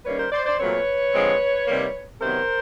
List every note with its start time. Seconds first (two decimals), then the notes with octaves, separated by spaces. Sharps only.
0.05 D#3 G3 A#3 C#4 B4 C#5
0.19 A#4 C5
0.32 C5 D5
0.46 C5 D5
0.59 A#2 F#3 A3 C4 B4 C#5
1.13 D3 F3 G#3 C4
1.67 C3 D#3 G3 A#3
2.21 C3 D#3 F#3 B3 A#4 C5